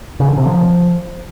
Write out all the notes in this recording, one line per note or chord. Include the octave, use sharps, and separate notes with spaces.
C#3
D3
C3
F3